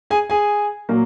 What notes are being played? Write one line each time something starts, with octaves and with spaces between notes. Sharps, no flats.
G#4 G#5
G#4 G#5
A#2 F#3 A#3